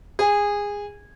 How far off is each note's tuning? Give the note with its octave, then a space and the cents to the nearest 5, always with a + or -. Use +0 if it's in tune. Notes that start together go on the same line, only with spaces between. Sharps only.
G#4 -20